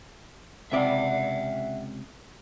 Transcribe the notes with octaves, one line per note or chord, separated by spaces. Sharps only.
C#2 C3 D5 E5 F#5